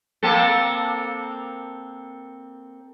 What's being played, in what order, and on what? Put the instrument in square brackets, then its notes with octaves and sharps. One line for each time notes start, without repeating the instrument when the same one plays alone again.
[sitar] A#3 C4 A4